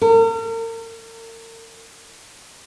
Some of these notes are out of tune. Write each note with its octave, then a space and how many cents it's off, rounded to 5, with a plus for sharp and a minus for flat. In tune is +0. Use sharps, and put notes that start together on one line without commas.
A#4 -40